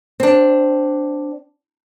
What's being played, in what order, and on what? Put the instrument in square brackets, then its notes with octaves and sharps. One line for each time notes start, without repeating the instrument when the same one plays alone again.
[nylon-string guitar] C4 D4